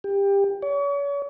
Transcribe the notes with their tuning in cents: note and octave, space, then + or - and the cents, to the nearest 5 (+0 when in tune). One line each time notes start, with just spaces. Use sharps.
G4 +20
C#5 +40